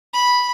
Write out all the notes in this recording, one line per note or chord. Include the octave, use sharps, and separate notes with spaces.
B5